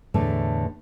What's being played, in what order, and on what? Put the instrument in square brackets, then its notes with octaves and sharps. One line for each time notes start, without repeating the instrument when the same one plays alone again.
[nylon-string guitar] E2 A2 D3 A3